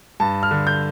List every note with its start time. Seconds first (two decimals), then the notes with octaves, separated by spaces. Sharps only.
0.20 G2 A5
0.43 F6
0.51 D3
0.67 G6